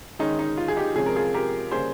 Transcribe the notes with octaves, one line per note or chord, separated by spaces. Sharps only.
D#3 G#3 C#4 D#4
D#4
F4
G#4
D#4 G4
C3 F3 G#3 C#4 G#4
A#4
F4 G#4
G4 A#4
C#3 G3 A#3 C#4 G#4 C5